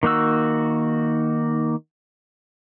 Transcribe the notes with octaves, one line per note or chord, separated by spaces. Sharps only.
D#3 A#3 D#4 F#4 E6